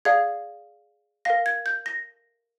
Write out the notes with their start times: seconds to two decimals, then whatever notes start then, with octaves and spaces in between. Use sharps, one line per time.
0.05 G#4 D5 F5 G#6
1.25 A#4 F5 A#6
1.46 G#6
1.66 G6
1.86 A#6